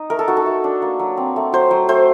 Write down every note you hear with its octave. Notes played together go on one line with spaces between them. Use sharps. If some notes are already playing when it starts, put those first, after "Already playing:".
Already playing: D#4 D#5
A3 A#4
A4
D#4 F#4
A4
A3
D4
A#3
F#3
C4
A3
F#3 C5
F#3
A3 C5